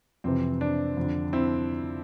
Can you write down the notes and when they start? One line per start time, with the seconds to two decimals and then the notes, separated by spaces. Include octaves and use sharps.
0.24 F2 C3 E3 C4
0.61 D4
0.97 F2 D3
1.33 C4 E4